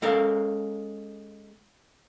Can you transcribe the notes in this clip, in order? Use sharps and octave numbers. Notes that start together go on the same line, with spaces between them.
G#3 C#4 A4 A#4 F5